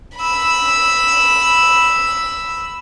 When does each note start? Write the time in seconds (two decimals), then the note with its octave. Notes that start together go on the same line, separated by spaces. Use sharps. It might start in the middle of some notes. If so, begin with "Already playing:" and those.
0.17 B5 E6